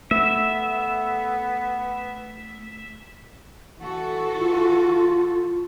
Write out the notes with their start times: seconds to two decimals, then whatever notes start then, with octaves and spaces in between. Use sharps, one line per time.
0.11 A3 B3 E5
3.82 E3 F#4 A4
4.39 F4